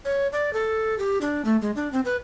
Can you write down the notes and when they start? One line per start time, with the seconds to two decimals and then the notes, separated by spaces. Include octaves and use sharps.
0.05 C#5
0.32 D5
0.53 A4
0.98 G4
1.21 D4
1.45 A3
1.62 G#3
1.76 D4
1.92 C4
2.05 B4